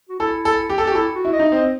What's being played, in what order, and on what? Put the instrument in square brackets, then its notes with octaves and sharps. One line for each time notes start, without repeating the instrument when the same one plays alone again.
[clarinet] F#4
[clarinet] E4 [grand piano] A4
[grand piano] A4
G4
A4
G4
[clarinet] F#4
[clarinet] E4 [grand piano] A4
[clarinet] F#4
[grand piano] E4
[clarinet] D#5
[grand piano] D#4
[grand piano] C4 [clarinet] D#5